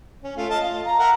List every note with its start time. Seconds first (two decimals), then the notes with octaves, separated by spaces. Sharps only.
0.24 C#4
0.37 A3 F4
0.50 D#5 F5 A5
0.62 F4
0.85 A#5
0.99 A#4 E5 F#5